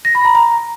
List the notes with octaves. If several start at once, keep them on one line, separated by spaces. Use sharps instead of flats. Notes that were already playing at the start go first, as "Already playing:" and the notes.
A#6
B5
A#5
A#5